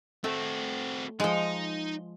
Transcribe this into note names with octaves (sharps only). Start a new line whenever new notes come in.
A3 C4 F#4
F3 G#3 D#4